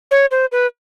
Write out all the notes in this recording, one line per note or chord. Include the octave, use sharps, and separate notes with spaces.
C#5
C5
B4